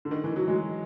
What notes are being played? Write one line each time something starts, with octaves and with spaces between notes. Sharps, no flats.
D3
D#3
E3
F#3
G#3